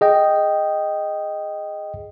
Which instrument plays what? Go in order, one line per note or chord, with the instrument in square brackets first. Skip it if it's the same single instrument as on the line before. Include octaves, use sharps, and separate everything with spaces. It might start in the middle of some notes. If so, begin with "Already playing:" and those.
[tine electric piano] G#4 D#5 G5